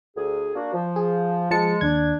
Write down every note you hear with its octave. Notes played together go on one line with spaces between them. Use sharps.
D2 G#4
A#3 D4 F#4
F3
G#4
F3 G#3 A5 C#7
D#2 D4 G#6